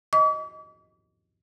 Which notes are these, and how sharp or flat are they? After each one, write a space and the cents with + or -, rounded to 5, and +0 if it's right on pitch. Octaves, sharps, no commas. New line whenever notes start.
D#5 +0 D6 -45